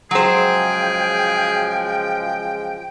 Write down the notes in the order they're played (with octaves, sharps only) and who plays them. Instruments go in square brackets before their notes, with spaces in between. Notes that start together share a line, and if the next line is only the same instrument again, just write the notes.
[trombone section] C#3 F3 G#3 [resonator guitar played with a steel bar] F#3 C5 [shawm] G#4 [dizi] G5